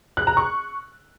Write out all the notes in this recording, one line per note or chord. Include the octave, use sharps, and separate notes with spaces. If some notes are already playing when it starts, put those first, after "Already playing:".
F#6
A#5
C#6